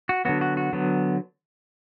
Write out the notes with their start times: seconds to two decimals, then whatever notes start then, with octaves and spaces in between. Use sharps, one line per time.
0.09 F#4
0.25 D3 F#3 B3 F#4
0.41 F#4
0.57 F#4
0.73 D3 F#3 B3